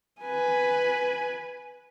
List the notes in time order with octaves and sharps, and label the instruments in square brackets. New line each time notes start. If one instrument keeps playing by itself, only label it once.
[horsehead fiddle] B4 G#5